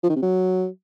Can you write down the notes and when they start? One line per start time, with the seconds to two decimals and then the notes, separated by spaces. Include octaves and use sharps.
0.03 F3
0.10 D#3
0.16 C3
0.22 F#3